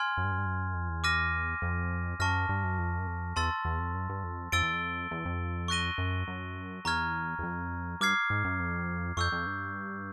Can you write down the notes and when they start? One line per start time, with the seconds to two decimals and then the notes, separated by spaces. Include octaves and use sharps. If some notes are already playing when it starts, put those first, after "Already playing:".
Already playing: G#5 C6 F6 G#6
0.17 F#2
0.24 G2
0.32 F#2
0.38 G2
0.46 F#2
0.74 F2
0.89 E2
1.04 D6 F6 A#6 D#7
1.62 F2
2.20 F#2 A5 C#6 F6 A#6
2.49 G2
2.64 F#2
2.78 F2
2.99 F#2
3.07 F2
3.36 E2 A5 C6 E6 A6
3.65 E2
3.79 F2
3.95 F#2
4.09 G2
4.24 F2
4.52 F2 E6 A6 D7 G7
4.63 E2
4.73 F2
5.11 E2
5.25 F2
5.68 C#6 F#6 A#6 D#7 G7
5.98 F#2
6.27 F#2
6.85 E2 A#5 C#6 F6 G#6
7.38 E2
7.43 F2
8.01 G2 D6 F6 G#6 C7
8.30 G#2
8.45 F#2
8.60 F2
9.17 F2 C#6 E6 G6
9.32 F2
9.46 G2